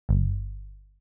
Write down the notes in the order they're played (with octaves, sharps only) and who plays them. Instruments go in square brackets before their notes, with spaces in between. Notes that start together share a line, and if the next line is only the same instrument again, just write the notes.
[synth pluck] G1